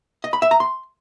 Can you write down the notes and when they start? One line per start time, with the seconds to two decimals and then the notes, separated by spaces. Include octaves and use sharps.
0.24 D#5
0.33 B5
0.42 E5
0.51 A#5
0.60 C6